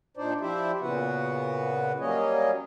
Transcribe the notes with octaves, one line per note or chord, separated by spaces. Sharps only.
A#2 D4 D#4 C5 D5
F3 E4 G4 C5 D5 E5
A#2 C#3 B3 F#4 B4 F#5
F#3 G3 A#3 C#4 C#5 D#5